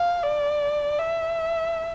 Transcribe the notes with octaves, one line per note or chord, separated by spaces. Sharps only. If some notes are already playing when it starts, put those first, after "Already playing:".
Already playing: F5
D5
E5